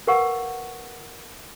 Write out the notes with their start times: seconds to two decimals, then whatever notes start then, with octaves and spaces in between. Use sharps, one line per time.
0.07 A#4 B4 F5 F#5 C#6